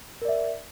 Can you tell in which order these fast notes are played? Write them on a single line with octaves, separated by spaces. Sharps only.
A#4 D5 E5